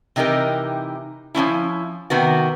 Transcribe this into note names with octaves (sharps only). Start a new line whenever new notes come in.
C3 E3 D#4 G4 A#4
F3 C4 C#4 E4
C3 D#3 B3 F#4